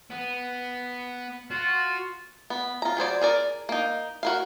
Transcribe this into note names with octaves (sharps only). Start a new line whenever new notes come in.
B3
F4 F#4
B3
F4 A#5
F#3 G#4 C5 D5
G#4 A#4 D5
A#3 D#4
F#4 A#4 F5